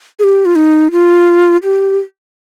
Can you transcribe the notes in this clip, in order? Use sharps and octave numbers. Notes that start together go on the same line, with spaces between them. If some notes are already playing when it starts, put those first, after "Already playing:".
G#4
G4
F4
D#4
F4
G4